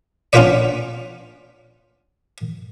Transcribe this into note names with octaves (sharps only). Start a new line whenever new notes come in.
C#4 D4 F4 F#4 B4 D5